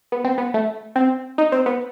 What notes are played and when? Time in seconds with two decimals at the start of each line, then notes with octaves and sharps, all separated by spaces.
0.12 B3
0.24 C4
0.38 B3
0.54 A3
0.96 C4
1.38 D#4
1.52 C4
1.66 B3